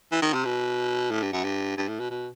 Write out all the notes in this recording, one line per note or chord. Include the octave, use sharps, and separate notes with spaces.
E3
D#3
C3
B2
A2
G2
F#2
G2
G2
A2
B2
B2